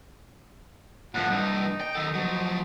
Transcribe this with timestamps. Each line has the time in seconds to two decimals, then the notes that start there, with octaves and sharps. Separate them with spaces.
1.15 A2 D3 F3 F#5
1.30 G2 E3 D#4
1.80 G5
1.95 D#3 A4
2.14 F3 F#3